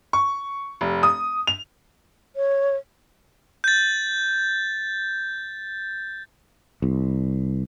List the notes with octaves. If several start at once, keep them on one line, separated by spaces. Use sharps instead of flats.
C#6
F1
D#6
F7
C#5
G6 A6
C2